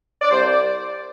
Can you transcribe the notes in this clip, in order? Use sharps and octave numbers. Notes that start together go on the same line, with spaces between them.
D5
C2 C5
D5